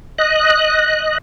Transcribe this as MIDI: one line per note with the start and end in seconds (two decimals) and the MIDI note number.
0.18 1.18 75
0.18 1.18 90